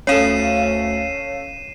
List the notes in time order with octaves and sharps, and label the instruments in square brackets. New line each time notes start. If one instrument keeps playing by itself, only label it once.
[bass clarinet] D2 [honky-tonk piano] C#4 A4 [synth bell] C#5 F5 [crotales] C7 D#7 E7